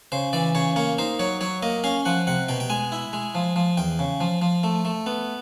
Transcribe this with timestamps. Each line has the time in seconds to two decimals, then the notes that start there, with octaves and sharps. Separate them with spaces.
0.12 C#3 C5
0.33 E3 D5
0.55 C#3 C#5
0.76 A#3 C#5
0.99 D#4 C5
1.19 F#3 C#5
1.41 F#3 C#5
1.63 A#3 D#5
1.84 C#4 F5
2.05 F3 F#5
2.27 C3 F#5
2.48 B2 G5
2.60 G5
2.70 G#3 G#5
2.92 E4
3.13 G#3
3.35 F3
3.56 F3
3.77 E2 G5
3.99 C#3
4.21 F3
4.42 F3
4.64 A3
4.85 A3
5.06 B3